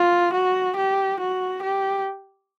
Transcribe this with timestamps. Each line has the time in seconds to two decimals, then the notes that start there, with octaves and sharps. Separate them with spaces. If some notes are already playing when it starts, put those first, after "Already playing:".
Already playing: F4
0.33 F#4
0.77 G4
1.20 F#4
1.63 G4